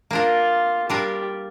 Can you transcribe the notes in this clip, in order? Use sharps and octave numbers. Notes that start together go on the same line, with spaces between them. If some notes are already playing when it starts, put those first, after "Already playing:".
A#3 D4 F4 A#4
G3 D4 F4 G4 A#4